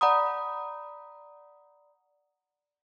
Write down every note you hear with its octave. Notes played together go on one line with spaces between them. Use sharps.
D5 F#5 A#5 B5 D#6